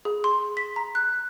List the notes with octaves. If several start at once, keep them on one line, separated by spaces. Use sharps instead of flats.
G#4
C6
B6
A#5
F#6